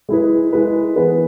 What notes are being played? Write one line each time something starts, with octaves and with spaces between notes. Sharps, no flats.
G#3 E4 G#4 B4
G#3 E4 G#4 B4
E3 B3 G#4 B4